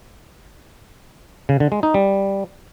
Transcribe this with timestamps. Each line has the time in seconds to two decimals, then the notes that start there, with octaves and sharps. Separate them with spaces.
1.49 C#3
1.60 D3
1.72 G#3
1.83 D#4
1.94 G3